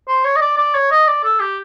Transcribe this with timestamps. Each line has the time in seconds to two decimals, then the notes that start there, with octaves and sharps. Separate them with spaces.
0.08 C5
0.25 C#5
0.36 D#5
0.41 D5
0.58 D5
0.75 C#5
0.91 D#5
1.07 D5
1.24 A4
1.40 G4